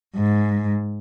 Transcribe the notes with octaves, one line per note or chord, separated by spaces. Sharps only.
G#2